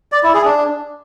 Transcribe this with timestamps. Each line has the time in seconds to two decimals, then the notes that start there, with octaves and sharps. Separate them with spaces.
0.12 D5
0.23 E4
0.34 G#4
0.45 D4